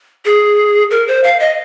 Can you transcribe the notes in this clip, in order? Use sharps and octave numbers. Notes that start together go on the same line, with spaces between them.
G#4
A#4
C5
F5
D#5